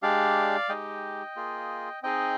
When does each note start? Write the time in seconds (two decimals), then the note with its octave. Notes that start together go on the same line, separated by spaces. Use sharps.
0.03 G#3 D4 G4 D5 F5
0.69 G#3 D#4 G4 D#5 G5
1.36 A#3 F4 G#4
2.03 C4 D#4 G#4 D#5 G5